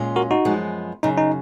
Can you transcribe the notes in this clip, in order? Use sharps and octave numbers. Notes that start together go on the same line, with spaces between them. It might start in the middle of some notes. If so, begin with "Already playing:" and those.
Already playing: A#2 G#3 C#4 F4
F#4 A#4
D#4 F#4
F#2 F3 G#3 B3
F#2 C#3 F#3 D#4
D#4